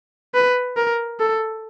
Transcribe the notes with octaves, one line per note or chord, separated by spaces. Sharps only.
B4
A#4
A4